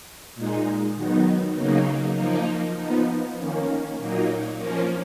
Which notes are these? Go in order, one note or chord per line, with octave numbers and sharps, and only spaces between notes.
A#2 G#3 D#4
D#3 F#3 B3 D#4
C#3 F#3 A#3 D#4
F3 A#3 D#4
F3 B3 D#4
D#3 A#3 C#4
A#2 F#3 A#3 D#4
F3 A#3 C#4